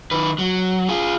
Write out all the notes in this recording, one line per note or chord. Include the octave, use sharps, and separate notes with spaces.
D#3 B4
F#3
F4 G#4